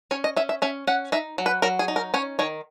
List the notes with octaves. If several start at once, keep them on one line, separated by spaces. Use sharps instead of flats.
C#4 C#5
D#5
C#4 E5
E5
C#4 E5
C#4 F#5
D#4 E5
F#3
B4
F#3 A#4
G#4
D#4
A#4
C#4 C#5
D#3 C#5